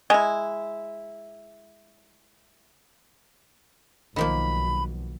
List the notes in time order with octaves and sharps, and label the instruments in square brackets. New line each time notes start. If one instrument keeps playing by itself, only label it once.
[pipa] G#3 E4
[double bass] B1 [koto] D#3 F3 A#3 [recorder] B5